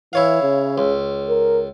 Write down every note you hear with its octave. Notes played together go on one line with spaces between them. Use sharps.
E3 E4 C#5 F5
C#3
C#2
A#4